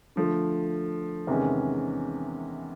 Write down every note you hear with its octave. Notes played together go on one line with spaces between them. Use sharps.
D3 F3 A3
E2 C3 D#3 G#3 C#4